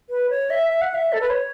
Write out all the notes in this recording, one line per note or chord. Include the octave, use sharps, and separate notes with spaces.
B4
C#5
E5
E5
F#5
E5
A4
B4
C#5